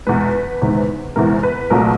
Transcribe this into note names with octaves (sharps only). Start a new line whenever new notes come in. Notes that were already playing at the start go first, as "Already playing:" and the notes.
E2 B2 G#3 B4
E2 C3 D#3 G#3
E2 C3 E3 G#3 A#4
B4
C2 A#2 F#3 A3 A#4